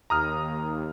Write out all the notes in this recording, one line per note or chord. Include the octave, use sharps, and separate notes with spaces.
D#2 A#5 D#6 F6